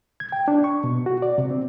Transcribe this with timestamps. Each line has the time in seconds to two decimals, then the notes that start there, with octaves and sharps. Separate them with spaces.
0.20 G#6
0.32 G5
0.48 D4
0.64 C#6
0.84 B2
1.06 F#4
1.22 D5
1.38 C3
1.51 C4